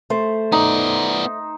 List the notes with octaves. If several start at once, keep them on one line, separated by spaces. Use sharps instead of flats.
A3 C5
B3 D#4 D5